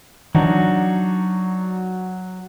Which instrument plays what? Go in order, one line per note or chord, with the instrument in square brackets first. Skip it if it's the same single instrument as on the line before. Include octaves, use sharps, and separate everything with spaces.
[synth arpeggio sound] E3 [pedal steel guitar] F#3 F#4 [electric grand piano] D4 D#4